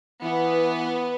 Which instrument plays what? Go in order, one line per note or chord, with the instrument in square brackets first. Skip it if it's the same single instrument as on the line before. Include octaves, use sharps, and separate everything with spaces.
[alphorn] E3 [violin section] B3